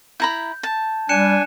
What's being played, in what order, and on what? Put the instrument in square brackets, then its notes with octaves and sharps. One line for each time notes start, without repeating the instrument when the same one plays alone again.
[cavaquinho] E4 A#5 B5 [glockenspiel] G6
[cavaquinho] A5
[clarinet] G3 [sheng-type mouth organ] D4 G#5 [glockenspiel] F#6 C#7 E7